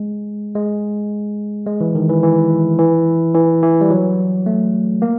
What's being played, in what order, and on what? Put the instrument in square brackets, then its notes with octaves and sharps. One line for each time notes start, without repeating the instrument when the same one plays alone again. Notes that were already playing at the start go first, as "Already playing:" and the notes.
Already playing: [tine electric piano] G#3
G#3
G#3
E3
D#3
E3
E3
E3
E3
E3
G3
F#3
A3
A#3